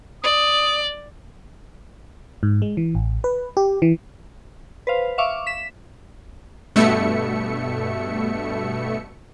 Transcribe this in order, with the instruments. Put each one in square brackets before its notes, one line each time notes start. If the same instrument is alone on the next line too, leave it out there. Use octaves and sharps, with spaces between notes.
[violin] D5 [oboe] D#6
[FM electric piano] G#2
G#3
E3
A1
B4
G4
E3
[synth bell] B4 C5 F5
E5 F5 C#6 D6
B6 E7
[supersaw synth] G2 B2 A3 E5 C#7